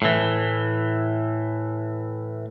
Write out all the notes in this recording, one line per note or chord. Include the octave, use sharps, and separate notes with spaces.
A2 E3